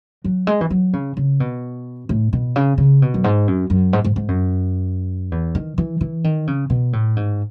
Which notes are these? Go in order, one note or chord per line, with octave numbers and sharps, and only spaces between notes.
F#3
G#3
E3
F#3
C#3
C#3
B2
A2
B2
C#3
C#3
B2
F#2
G#2
F#2
F#2
G#2
G#2
G#2
F#2
E2
D#3
E3
E3
D#3
C#3
B2
A2
G#2